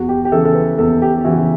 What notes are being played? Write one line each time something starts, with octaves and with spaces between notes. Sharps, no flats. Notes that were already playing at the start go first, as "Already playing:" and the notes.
Already playing: E2 F#4
G4
G4
C#3 E3 A4
A4
B4
E2 A4
G4
C#3 E3 F#4